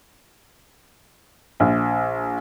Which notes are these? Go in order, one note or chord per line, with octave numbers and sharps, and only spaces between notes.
A#1